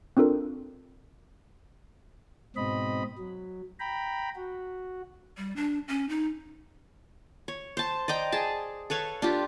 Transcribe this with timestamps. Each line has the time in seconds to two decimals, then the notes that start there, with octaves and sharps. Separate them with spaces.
0.17 C4 D4 F4 A4 A#4
2.56 G#2 B2 C4 D#5 B5
3.18 F#3
3.80 G5 A#5 B5
4.35 F#4
5.37 G3
5.56 D4
5.88 C#4
6.09 D#4
7.48 C#5
7.77 C5 A5
8.08 D5 D#5 G5 A#5
8.32 G#4 A5
8.90 A4 B4 C#5 F5
9.22 D4 F4 G4